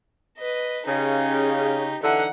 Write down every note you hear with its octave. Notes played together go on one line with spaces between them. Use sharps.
B4 D#5
C#3 D#4 G4
D3 E3 D#4 F#5